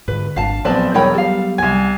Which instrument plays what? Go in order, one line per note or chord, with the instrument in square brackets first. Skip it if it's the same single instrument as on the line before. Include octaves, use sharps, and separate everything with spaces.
[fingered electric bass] G#2 D3 [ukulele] B4
[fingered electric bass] G#1 G#2 D4 [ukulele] F5 A5
[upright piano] A#1 C4 [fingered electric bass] F#3 B3 [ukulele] B4 D5 A5
[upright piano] E1 C#5 B5 [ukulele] D#4 A#4 G5
[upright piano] G3 [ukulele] A4 F5
[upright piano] C2 G#6 [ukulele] G#5